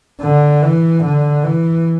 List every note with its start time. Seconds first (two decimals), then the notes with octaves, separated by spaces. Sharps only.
0.21 D3
0.63 E3
1.04 D3
1.44 E3